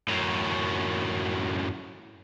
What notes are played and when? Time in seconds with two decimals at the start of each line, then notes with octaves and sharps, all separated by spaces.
0.09 F#2 A2